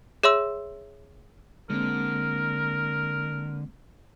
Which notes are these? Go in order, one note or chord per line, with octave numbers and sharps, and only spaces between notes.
G#4 C#5 E5 C6 E6
D3 G#3 A#3 C4 A#4